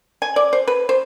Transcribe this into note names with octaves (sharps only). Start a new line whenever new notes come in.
G#5
D5
C5
B4
C5